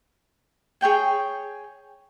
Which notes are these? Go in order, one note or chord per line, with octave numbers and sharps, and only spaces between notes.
G#4 C#5 G5 G#5